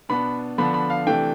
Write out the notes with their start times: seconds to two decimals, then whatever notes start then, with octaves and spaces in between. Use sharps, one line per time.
0.09 B2 B3 D4 B5
0.58 D3 F3 B3 D4 B5
0.74 B5
0.90 F5
1.07 C3 E3 A3 D4 G5